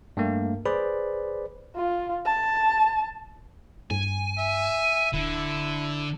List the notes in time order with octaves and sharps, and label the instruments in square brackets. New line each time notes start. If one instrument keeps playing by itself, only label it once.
[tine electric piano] G2 A3 A#3
G#4 B4 C5 D5 B5
[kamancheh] F4
A5
[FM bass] G2 [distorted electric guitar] G#5
[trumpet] E5
[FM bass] D1 [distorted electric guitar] D3 [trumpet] E4